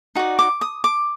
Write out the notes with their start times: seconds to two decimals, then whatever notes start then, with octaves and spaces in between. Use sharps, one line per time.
0.15 D#4 F#4 D5
0.39 D6
0.61 D#6
0.84 D6